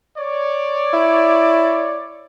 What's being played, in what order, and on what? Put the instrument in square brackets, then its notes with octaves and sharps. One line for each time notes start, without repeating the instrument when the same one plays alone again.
[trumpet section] C#5 D5
[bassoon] E4